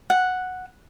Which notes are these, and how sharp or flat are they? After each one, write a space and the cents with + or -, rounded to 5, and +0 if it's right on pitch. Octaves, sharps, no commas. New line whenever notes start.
F#5 -5